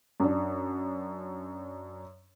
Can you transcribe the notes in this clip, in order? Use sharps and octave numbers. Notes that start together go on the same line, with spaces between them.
F#2 D4